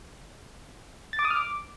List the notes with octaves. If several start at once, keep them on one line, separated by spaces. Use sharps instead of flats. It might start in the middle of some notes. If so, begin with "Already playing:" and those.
A6
D6
D#6
F6
D6